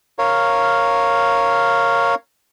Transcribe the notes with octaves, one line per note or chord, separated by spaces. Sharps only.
A#4 C#5 F5